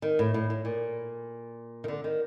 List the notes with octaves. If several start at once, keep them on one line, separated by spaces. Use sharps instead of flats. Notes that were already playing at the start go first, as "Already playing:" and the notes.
D#3
A2
A2
A2
A#2
D#3
D3
D#3